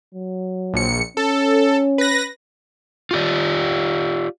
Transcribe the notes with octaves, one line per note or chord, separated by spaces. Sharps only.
F#3
A#1 C#7
C#4 A4
B4 A#6
F4 G4 D5